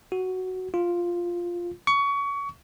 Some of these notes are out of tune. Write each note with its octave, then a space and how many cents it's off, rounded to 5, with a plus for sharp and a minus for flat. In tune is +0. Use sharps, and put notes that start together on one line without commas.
F#4 +5
F4 +0
C#6 +25